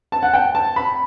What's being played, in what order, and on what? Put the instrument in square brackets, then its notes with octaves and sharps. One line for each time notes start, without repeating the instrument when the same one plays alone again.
[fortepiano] A5
F#5
G5
A5
B5